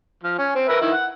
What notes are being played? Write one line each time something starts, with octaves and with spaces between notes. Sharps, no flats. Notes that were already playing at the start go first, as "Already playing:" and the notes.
F3
C#4
C4
A#4 B4 E5
D#3 E4
F#5